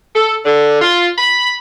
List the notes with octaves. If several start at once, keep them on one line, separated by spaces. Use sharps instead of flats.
A4
D3
F4
B5